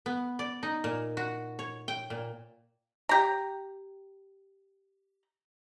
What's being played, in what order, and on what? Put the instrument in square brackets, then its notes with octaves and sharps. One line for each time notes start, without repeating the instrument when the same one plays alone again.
[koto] B3
D5
D#4
A#2
F#4
C#5
G5
A#2
[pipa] G4 A#5